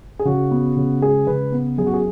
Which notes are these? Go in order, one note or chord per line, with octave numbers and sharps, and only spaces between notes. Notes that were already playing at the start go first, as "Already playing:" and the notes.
G#4
C#3 F#4
B3
C#3
G#3 G#4
C#3 B4
B3
F#2 G#4
F#4
G#4